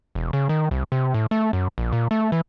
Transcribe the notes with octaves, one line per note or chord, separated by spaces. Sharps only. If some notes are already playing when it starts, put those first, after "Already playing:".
E1
C#3
D#3
C2
C3
A2
A3
F#2
A#1
A#2
A3
E3